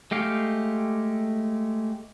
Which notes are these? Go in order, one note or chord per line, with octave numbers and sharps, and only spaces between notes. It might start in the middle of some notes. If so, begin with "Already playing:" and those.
G#3 A3 G4 F5